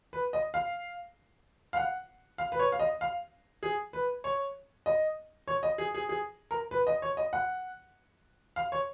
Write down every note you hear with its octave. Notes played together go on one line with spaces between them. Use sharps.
B4
D#5
F5
F5
F#5
F5
B4
C#5
F5
D#5
F5
G#4
B4
C#5
D#5
C#5
D#5
G#4
G#4
G#4
A#4
B4
D#5
C#5
D#5
F#5
F5
C#5